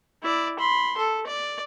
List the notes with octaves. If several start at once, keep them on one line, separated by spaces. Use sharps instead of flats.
E4 D5
B5 C6
A4
D5